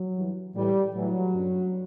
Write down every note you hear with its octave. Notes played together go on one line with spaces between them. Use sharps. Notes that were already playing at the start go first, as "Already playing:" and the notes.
Already playing: F#3
G2 E3
A2 E3 G3
A2 E3 F#3
F#2 D3